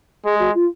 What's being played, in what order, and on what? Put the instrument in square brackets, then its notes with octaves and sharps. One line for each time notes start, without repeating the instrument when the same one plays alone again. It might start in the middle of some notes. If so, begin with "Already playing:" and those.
[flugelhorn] G#3 [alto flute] G#4
[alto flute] F#4
F4